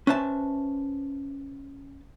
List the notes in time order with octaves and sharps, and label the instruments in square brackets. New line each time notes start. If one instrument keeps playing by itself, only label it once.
[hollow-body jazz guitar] C#4 B4 C5 E5 A5